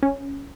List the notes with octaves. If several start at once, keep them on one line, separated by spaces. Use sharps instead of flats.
C#4